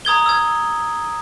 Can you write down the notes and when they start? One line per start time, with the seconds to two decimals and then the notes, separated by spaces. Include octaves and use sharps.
0.05 A#5 D#6 G#6 G7
0.26 E6 G#6